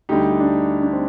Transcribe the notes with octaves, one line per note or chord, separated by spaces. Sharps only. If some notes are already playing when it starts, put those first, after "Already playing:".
D2 D3 G3 D#4 G4
D4
D4
C4